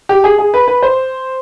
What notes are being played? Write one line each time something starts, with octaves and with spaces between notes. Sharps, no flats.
G4
G#4
G#4
B4
B4
C5